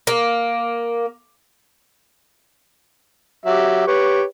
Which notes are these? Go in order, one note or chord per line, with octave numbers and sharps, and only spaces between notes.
A#3
F#3 G4 E5
G4 B4 C#5